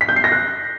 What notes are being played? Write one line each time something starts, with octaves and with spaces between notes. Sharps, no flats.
B6
G6
C7
A#6
F#6